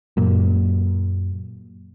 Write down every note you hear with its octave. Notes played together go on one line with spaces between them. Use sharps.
F#2 A#2